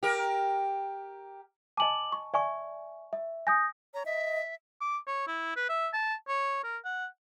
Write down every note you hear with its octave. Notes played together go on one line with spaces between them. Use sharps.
G4 A#4
D#5 G#5 A5 D6 F#7
C#6
D5 E5 G#5 C#6
E5
G#5 D#6 G6 A#6
C#5 A#5
D#5 E5
D6
C#5
E4
B4
E5
A5
C#5
A#4
F#5